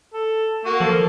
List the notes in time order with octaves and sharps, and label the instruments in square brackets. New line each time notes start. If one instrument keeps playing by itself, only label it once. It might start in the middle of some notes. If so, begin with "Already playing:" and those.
[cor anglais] A4
[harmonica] A#3 [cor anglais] F#4
[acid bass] F3 [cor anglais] A4